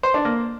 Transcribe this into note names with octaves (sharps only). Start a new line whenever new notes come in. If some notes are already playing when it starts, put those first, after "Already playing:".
C5
D4
A#3